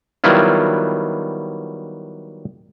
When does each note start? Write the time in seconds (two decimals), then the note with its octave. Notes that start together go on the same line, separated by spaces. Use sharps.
0.24 D#3 F#3 G3 B3 E4 F4